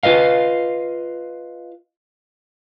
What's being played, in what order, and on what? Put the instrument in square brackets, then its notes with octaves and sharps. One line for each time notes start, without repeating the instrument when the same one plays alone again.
[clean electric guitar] F4 B4 D#5 F5